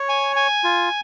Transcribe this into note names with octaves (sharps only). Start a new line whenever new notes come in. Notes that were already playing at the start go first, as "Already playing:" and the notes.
Already playing: C#5
G#5
G#5
F4